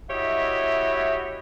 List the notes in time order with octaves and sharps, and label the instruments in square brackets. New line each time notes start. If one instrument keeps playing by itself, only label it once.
[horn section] E4 F#4 G4 C#5 D#5 E5